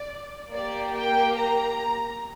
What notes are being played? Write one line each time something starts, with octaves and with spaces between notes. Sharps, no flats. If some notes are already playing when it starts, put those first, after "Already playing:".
Already playing: D5
A#3 G4 D5
G5
A#5